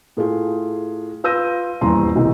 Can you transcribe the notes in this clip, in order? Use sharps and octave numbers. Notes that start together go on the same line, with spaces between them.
A2 A3 F4 G#4
F4 B4 E6 G6 A#6 D#7
D#1 E2 G2 A#5 C6
B1 C3 D#3 E3